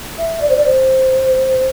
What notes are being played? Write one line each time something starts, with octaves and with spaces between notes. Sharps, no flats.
E5
D5
C5
D5
C5